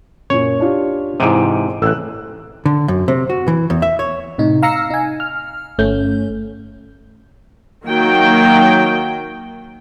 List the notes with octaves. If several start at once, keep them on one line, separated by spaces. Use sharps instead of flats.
F#2 A#2 C#5
D4 F4 G4
G#2 C3 E3 D7 D#7
A1 E6 F#6
D3
F#2
C3
F#4
E3
E2
E5
C#5
A2 C3 D#4
F5 A#5 E6 A#6 C7 C#7
D#4 G#5
F6
G1 A3 C#4 G6
D#3 F#3 A#3 G5